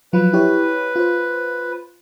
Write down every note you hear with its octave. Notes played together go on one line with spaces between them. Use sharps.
F3 F#3 F4 B4
E4 G4 C#5
F4 C5